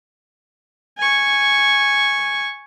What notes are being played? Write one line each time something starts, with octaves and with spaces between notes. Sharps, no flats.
G#5 C#6